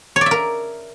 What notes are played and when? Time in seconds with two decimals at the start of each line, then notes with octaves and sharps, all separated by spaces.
0.16 C#5
0.21 D5
0.26 E5
0.31 A#4